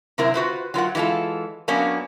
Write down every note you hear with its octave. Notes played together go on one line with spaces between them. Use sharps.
F#2 C3 C4 E4 A#4
F4 F#4 B4 C5
F#3 F4 A#4 F#5
E3 G#3 A#3 F4 A4
F#3 A#3 B3 C#4 D4